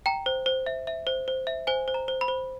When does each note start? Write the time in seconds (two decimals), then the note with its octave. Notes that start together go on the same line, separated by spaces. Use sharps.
0.06 G5 A#5
0.26 C5
0.46 C5
0.66 E5
0.87 E5
1.07 C5
1.28 C5
1.47 E5
1.67 C5 G#5
1.88 C5
1.94 A#5
2.08 C5
2.21 B5
2.28 C5